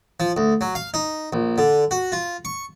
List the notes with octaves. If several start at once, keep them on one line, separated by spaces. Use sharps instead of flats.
F3
D2
F#3
F5
D#4
A#1
D3
F#4
F4
C#6